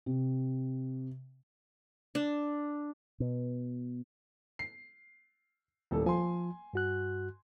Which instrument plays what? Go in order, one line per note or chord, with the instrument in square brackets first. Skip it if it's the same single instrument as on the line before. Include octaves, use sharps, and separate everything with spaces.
[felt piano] C3
[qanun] D4
[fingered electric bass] B2
[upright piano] C7
D#1 A2 A4
[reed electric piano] F3 [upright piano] G#5 C6
[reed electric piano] G2 F#4 F#6